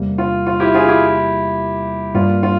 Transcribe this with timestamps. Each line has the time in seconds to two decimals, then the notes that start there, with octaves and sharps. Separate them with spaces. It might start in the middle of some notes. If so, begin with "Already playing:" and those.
Already playing: E2 C3 G3 A#3
0.18 F4
0.47 F4
0.60 E4 G4
0.74 F4 G#4
0.89 E4 G4
2.14 G2 G3 A#3 F4
2.43 F4